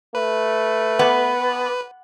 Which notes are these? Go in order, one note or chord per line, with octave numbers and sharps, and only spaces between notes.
A3 B4
B3